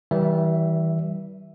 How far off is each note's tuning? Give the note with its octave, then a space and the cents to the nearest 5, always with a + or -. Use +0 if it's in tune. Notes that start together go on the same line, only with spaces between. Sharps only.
E3 -35 G3 -30 E5 +0